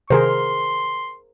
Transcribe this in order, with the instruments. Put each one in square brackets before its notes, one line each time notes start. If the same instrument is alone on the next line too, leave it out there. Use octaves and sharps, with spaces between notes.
[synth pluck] C3 D#3 [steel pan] G#4 A#4 C5 [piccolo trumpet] C6